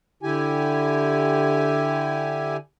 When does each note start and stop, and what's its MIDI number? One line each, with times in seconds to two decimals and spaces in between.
0.23 2.57 50
0.23 2.57 64
0.23 2.57 67
0.23 2.57 80